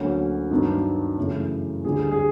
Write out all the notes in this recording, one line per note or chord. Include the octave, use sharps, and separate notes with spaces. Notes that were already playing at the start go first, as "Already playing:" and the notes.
Already playing: D2 D3 F#3 A#3 C#4
G2 D#3 F#3 B3 D4
F#2 C#3 E3 A3
D2 D3 G3 G#4
G#4